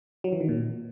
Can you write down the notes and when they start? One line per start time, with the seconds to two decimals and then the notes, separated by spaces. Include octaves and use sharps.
0.24 F#3
0.32 E3
0.40 D#3
0.48 A#2